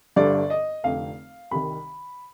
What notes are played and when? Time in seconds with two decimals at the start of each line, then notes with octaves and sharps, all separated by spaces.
0.16 G1 G2 D3 D5
0.50 D#5
0.84 F1 F2 D3 F5
1.51 C2 C3 D#3 B5